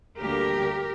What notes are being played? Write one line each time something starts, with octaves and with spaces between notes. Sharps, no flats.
D2 D3 G3 A#3 G4 A#4